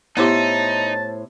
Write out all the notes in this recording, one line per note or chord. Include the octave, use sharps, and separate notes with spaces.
A2 B3 D#4 E4 G4 C5 E5 A5